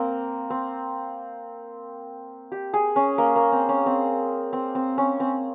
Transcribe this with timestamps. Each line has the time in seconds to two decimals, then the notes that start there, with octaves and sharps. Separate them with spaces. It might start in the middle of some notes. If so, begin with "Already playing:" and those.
Already playing: A#3 C4
0.50 C4
2.52 G4
2.74 G#4
2.96 C#4
3.18 A#3
3.36 A#3
3.52 C4
3.69 C#4
3.86 C4
4.53 C4
4.75 C4
4.98 C#4
5.20 C4